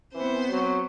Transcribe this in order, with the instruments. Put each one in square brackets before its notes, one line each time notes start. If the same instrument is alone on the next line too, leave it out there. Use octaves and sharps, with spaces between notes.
[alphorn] E3 [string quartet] B3 C5 [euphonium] C4
[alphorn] F#3